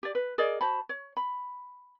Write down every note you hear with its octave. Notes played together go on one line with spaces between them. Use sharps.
G4 D5
B4
G#4 A#4 D5 D#5
F#4 C5 A5 B5
C#5
B5